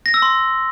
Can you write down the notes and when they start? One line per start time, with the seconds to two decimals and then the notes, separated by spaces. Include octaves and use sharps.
0.06 A#6
0.14 E6
0.22 C6